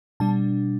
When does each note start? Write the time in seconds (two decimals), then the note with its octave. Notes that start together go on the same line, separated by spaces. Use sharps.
0.20 B2 G3 D4 A5